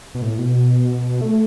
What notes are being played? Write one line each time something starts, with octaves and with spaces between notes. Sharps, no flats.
B2
A2
B2
A3